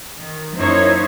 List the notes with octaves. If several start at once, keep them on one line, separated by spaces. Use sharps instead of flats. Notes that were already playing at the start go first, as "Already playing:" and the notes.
D#3
F#2 A#3 D#4 E4 C5 C#5